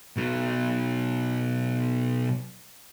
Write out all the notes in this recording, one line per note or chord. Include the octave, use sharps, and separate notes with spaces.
B2 F#3